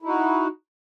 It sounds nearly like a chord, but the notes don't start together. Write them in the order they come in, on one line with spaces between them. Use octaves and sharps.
E4 D#4 F#4